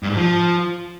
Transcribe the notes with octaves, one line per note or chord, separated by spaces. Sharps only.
G2
G#2
F3